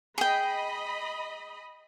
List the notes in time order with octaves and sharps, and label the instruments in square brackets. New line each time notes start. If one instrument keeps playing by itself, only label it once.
[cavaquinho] G#4 G5 [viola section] D#5 B5